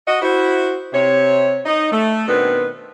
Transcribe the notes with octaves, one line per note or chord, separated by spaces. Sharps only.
F#4 D#5
E4 F#4 C5
C3 C#5
D#4 D#5
A3
B2 D#3 B3 C4 D4 B4